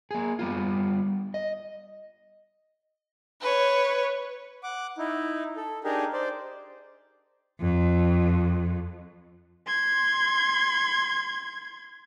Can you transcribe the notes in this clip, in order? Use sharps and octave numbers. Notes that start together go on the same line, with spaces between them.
A#3 G#4
G3 B3 F4
D#5
B4 C#5
F#5 D6
D#4 E4
A4
D4 D#4 G4 G#4 A#4
C5 D5
F2
C6 G#6